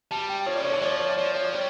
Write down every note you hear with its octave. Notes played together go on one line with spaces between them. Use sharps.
G3 A5
G5
F3 C#5
C#3 D5
D3 C#5
E3 D5
F3 C#5
D5
C#5
D5
F3 C#5
D5
C#5
D5
G3 C#5